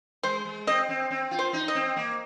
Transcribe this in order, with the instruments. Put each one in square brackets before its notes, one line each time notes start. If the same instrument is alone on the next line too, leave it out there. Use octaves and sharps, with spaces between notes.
[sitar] G#3 [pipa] C5
[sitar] G#3
[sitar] C4 [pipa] D#5
[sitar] C4
C4
F4
[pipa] C5
[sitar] D#4
[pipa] D#5
[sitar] C4
A#3